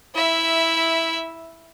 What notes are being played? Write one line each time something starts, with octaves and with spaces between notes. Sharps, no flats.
E4 E5